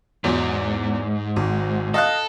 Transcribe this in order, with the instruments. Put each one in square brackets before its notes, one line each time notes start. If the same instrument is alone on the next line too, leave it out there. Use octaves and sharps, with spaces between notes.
[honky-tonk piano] E2 F#3 [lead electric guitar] G#2
[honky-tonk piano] G#1
[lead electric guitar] A4 [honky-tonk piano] D#5 F5 F#6